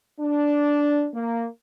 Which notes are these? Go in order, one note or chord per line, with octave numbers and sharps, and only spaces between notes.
D4
A#3